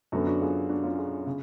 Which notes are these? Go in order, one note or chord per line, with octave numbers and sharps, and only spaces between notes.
F#2 D3 F#3 B3 F#4 A4
D4 F#4
F4 G#4
D4 F#4
C#4 F4
F4 G#4
C#3